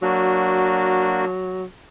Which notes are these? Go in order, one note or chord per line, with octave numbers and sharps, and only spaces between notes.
F#3 A#3 D4 F#4